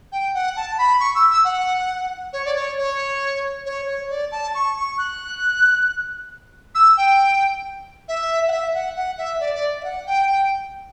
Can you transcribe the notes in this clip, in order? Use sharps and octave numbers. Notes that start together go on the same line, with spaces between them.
G5
F#5
A5
B5
C#6
E6
E6
F#5
C#5
D5
C#5
C#5
C#5
C#5
D5
A5
C#6
C#6
F#6
E6
G5
E5
F#5
E5
F#5
F#5
E5
D5
D5
E5
F#5
G5
G5